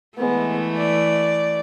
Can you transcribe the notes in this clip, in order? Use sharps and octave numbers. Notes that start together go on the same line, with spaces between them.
E3 G#3 A3 B3
D5